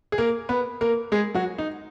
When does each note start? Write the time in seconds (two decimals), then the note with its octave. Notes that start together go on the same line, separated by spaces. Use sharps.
0.12 G#4
0.18 A#3 A#4
0.49 B3 B4
0.81 A#3 A#4
1.12 G#3 G#4
1.34 F#3 F#4
1.58 D#4